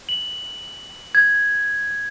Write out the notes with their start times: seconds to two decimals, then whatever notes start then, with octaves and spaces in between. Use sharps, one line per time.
0.09 F#7
1.15 G#6